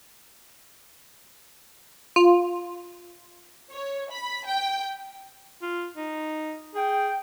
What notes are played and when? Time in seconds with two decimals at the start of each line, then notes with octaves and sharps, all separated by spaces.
2.16 F4
3.72 C#5
4.11 B5
4.46 G5
5.62 F4
5.97 D#4
6.75 G#4 G5